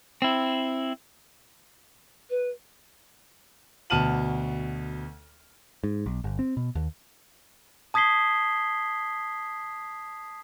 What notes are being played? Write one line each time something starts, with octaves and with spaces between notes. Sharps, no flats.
C4 E4
B4
D2 B2 A5 F6 D#7 F#7
G#2
B1
G1
C4
B2
D#2
A5 D#6 G#6 B6 C7 G7